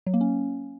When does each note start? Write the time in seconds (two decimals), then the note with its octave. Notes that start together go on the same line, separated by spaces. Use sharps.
0.07 F#3
0.14 A#3
0.21 C#4